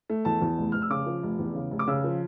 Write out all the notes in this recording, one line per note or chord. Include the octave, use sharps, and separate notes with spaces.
A3
E2 A5
E2
F1
F1 F6
E6
C#3 D6
F3
F1
E2
C#3
F1
D6
C#3 E6
F3